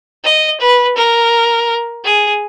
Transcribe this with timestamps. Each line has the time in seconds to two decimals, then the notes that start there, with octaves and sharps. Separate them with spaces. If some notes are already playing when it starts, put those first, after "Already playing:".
0.24 D#5
0.60 B4
0.96 A#4
2.04 G#4